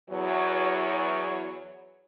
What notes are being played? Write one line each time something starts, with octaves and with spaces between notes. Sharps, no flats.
E2 F#3 C#5